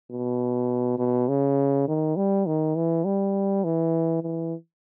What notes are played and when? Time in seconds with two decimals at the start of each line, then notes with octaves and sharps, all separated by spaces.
0.11 B2
0.99 B2
1.28 C#3
1.88 D#3
2.16 G3
2.46 D#3
2.76 E3
3.05 G3
3.64 E3
4.23 E3